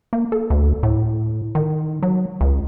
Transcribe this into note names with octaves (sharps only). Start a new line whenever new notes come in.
A#3
A4
D2
A2
D#3
F#3
C#2